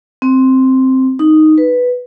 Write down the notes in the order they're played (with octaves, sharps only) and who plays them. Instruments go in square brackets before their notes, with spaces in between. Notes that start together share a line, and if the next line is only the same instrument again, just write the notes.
[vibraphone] C4
D#4
B4